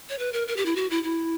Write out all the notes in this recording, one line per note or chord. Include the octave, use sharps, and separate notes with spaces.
C#5
B4
A#4
A#4
G4
E4
F#4
E4
E4